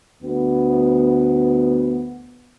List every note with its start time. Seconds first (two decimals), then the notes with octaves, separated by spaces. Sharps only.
0.23 D2 B3